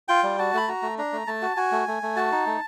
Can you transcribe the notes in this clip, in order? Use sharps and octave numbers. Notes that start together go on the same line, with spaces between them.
F4 G5
G3
F#4 A5
A3 B5
F#4 A#5
A3
D4 A#5
A3
A3 A5
F#4
F#4 G#5
A3
A3
A3
F#4 A5
D#4
A3